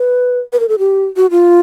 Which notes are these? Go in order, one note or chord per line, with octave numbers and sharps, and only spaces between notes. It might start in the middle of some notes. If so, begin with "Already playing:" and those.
Already playing: B4
B4
A#4
A4
G4
F#4
F4